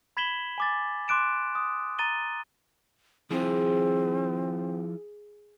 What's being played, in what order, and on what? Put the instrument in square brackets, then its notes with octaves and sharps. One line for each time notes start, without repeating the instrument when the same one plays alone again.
[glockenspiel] B5 G#6 B6 E7 F#7 G7
G#5 D6 A6
C6 D6 F#6 D7 E7
D#6
A#5 A6 D#7 G7
[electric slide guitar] F3 E4 F4 [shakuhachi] C4 [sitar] G#4